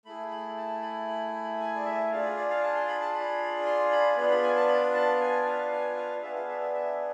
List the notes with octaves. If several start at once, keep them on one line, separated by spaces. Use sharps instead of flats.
A3 E4 G#4 B5
B5
A5
B5
B5
G#5
D5
E5
D4 F4 G#4 F5
D5
D5
F5
A5
C6
B5
A5
B5
C6
B5
B3 D4 F4 B5
B5
G#5
A5
B5
A5
G#5
F5
G#5
F5
B3 D4 G#4 E5
F5
E5
E5
E5